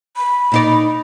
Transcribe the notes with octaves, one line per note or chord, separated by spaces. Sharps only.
B5
A#2 D#4 D5